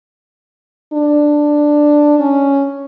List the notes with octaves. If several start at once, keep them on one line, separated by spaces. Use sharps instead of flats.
D4
C#4